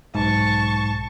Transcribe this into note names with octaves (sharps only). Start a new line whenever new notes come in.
B1 G#2 A5 C#6